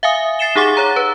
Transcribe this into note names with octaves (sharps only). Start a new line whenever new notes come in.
E5 F5 G#5 D#6
A6 C7 C#7 E7 G7
D#4 G4 G#4 F#5 D6 A6
C#5 A#5 A6
B4